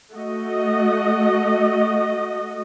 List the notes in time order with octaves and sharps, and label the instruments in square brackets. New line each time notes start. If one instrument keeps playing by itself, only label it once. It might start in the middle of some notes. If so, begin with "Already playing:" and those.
[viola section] A3 F#4 D#5